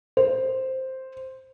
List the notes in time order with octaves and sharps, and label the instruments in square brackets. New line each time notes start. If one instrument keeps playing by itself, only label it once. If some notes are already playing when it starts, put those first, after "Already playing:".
[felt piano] C5